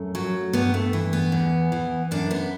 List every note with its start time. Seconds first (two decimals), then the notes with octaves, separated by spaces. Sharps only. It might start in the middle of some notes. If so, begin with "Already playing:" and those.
Already playing: F#2 A3
0.15 F#3
0.53 G2 B3
0.74 A3
0.93 E3
1.13 B3
1.32 E2
1.72 E3
2.11 F#2 D4
2.31 B3